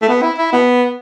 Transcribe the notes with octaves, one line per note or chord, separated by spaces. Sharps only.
A3
B3
E4
E4
B3